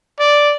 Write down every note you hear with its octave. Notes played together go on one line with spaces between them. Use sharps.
D5